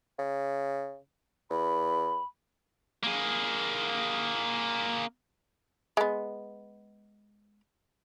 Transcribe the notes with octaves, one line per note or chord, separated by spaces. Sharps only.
C#3
E2 B5
A#3 G#4
G#3 B3